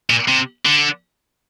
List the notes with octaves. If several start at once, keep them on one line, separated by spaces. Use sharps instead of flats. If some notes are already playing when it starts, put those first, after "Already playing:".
A#2
C3
D3